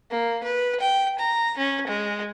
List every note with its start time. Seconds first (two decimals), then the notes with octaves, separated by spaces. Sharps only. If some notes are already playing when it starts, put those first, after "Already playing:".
0.11 A#3
0.44 B4
0.80 G5
1.19 A#5
1.58 C#4
1.87 G#3